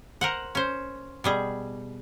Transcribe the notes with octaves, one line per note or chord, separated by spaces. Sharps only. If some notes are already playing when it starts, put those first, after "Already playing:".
A#4 C5 F#5
C#4 C5
B2 G3 G#4